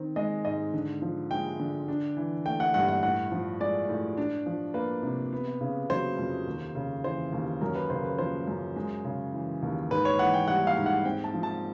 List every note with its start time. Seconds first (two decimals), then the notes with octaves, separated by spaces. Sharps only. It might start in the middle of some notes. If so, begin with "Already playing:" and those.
Already playing: D#3 C4
0.16 G#3 D#5
0.45 G#2 D#5
0.73 D3
1.02 F3
1.31 G#3 G5
1.59 D3
1.88 D4
2.17 E3
2.45 A3 G5
2.60 F#5
2.74 G2 F#5
2.88 F#5
3.03 A2 F#5
3.31 F3
3.60 G#3 D5
3.89 A2
4.17 D4
4.46 F3
4.74 A#3 B4
5.03 C3
5.33 B3
5.61 C#3
5.90 F#3 C5
6.18 F2
6.47 D#2
6.75 C#3
7.04 E3 C5
7.33 D#2
7.61 F#2 A#4
7.75 B4
7.90 C#3 C5
8.04 B4
8.18 F3 C5
8.47 F#2
8.76 G#3
9.04 C#3
9.33 E3
9.62 D#2
9.90 G#2 B4
10.05 C#5
10.19 E3 F#5
10.34 G5
10.48 G3 F#5
10.67 F5
10.77 G#2
10.86 F#5
11.05 C4 G5
11.24 A5
11.34 F3
11.43 A5